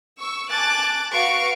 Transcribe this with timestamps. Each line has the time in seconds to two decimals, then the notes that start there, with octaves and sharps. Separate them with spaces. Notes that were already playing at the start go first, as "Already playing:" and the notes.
0.19 C#6 E6
0.50 G#5 A5 D6 F#6 A6
1.14 F#4 B4 F5 C#6 D7